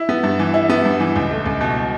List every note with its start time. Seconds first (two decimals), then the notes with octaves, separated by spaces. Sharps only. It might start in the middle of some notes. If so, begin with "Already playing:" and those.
Already playing: E4
0.09 B3
0.23 G2
0.39 E3
0.54 E4
0.69 B3
0.85 G2
1.00 E3
1.16 C#2
1.31 A3
1.46 C#2
1.61 B2